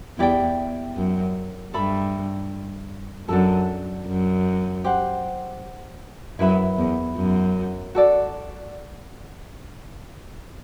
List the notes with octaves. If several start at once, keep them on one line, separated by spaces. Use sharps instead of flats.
E2 E4 G4 D5 G5
F#2
G2 A4 E5 B5
F#2 D4 F#4 A4
F#2
G4 C5 F#5
F#2 E4 B4 E5 B5
E2
F#2
F#4 A4 D5